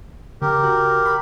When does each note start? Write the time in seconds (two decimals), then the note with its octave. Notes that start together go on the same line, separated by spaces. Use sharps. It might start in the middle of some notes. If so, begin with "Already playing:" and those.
0.42 C#3 G4 A#4
0.64 F#4
1.06 B5